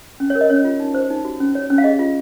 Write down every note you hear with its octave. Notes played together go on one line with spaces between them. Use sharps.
C#4
C#5
A#4
D#5
C#4 C#5
F4
D#4
C5
D#4
F#4
C#4
C#5
C#4
F5
G#4 D#5
F4